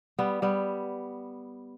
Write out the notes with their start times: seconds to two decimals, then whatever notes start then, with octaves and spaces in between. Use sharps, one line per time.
0.19 G3 B3
0.42 G3 B3